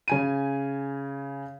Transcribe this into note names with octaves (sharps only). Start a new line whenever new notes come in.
C#3 G#5 D#7